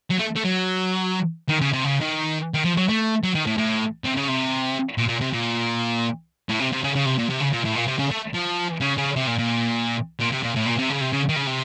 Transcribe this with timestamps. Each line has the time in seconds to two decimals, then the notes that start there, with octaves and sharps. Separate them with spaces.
0.10 F#3
0.19 A3
0.36 A3
0.44 F#3
1.49 D#3
1.61 C#3
1.73 C3
1.84 C#3
2.01 D#3
2.54 D#3
2.65 F3
2.77 F#3
2.89 A3
3.23 F#3
3.35 D#3
3.47 A2
3.57 A2
4.04 C3
4.17 C#3
4.28 C3
4.98 A#2
5.08 A#2
5.21 C3
5.33 A#2
6.49 A2
6.59 C3
6.72 C3
6.84 C#3
6.95 C#3
7.06 C3
7.19 A#2
7.30 C3
7.41 C#3
7.53 A#2
7.65 A2
7.76 A#2
7.88 C3
7.99 C#3
8.11 A3
8.34 F3
8.81 C#3
8.97 C#3
9.16 C3
9.27 A#2
9.38 A#2
10.20 A#2
10.32 C3
10.43 A#2
10.55 A2
10.66 A#2
10.78 C3
10.90 C#3
11.01 C3
11.13 C#3
11.29 D#3
11.36 C#3
11.47 C3